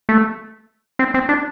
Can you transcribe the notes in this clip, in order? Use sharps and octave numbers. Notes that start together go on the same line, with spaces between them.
A3
C4
C4
D4